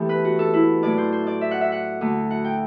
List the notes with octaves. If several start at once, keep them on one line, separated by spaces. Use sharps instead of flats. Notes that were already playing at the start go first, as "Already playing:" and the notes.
Already playing: E2 C3 E3 A3 G4 A4
B4
F#4
A4
E4
A2 F#3 A3 D5
C5
C5
D5
E5
F#5
E5
F#5
D2 D3 A3
F#5
G5